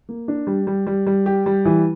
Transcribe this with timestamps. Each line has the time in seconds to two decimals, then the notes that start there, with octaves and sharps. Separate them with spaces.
0.09 A#3
0.28 D4
0.47 G3
0.67 G3
0.87 G3
1.06 G3
1.26 G4
1.46 G3
1.65 E3